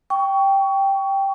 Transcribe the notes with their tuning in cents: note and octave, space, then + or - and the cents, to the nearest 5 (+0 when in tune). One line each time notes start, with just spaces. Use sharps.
G5 +0 C#6 +20